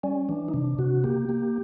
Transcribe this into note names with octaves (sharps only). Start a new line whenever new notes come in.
G3 C#4
E3 D4
D#4
C3 D4
C3 F#4
A#3 G4
A#3